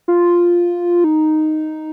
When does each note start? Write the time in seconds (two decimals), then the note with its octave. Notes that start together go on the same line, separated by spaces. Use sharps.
0.08 F4
1.04 D#4